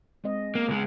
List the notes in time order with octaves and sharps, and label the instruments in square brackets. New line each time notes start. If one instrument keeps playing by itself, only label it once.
[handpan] G#3 C4 D#5
[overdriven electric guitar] A#3 [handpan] B3
[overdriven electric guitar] C#2 G#3